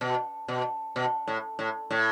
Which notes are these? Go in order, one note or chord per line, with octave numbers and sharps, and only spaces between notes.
B2
B2
B2
A2
A2
A2